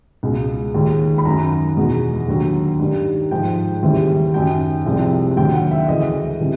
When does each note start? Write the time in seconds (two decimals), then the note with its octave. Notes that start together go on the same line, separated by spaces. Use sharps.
0.23 C#2 B2 G#3
0.74 D#2 D#3 G#3
1.18 B5
1.25 F#2 D#3 F#3 A#5
1.77 E2 B2 G#3
2.28 D#2 D3 F#3
2.79 G2 D#3 G3
3.31 G#2 F3 G#3 G5
3.83 D#2 C#3 E3 G3
4.34 F#2 D#3 F#3 G5
4.86 C2 C3 F3 G#3
5.37 D#2 D3 F#3 G5
5.54 F#5
5.71 E5
5.88 D2 C#3 E3 G#3 D#5
6.40 C3 E3 G3